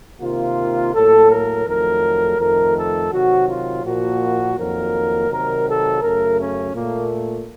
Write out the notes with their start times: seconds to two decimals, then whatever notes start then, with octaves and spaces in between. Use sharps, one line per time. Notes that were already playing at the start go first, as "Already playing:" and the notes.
0.20 C3 D#3 A#3 F4
0.93 A2 F#3 A#3 A4
1.30 A#4
1.66 F2 D#3 F#3 A3 A#4
2.38 F2 D#3 A3 A#4
2.75 A4
3.11 C3 D#3 F#3 F#4
3.47 F4
3.84 A#2 F3 A#3 F#4
4.57 F2 D#3 F#3 A#3 A#4
5.29 C3 D#3 F#3 A#4
5.66 A4
6.01 F#2 C#3 A3 A#4
6.38 C#4
6.74 A#2 A3 A#3